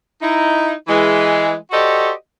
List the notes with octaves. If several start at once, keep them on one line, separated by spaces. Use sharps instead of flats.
D#4 E4
E3 G#3
F#4 G4 A4 C5 D5 D#5